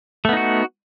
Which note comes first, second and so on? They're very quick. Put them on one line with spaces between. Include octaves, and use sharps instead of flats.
A3 B3 D#4 F#4